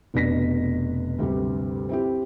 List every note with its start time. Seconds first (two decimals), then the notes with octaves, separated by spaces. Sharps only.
0.14 F1 B2 D4 A#6 B6
1.19 D2 G2 C3 G3
1.89 C4 E4 G4